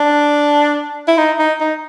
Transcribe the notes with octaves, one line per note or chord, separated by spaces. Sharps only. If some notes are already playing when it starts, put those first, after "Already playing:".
Already playing: D4
E4
D#4
D#4
D#4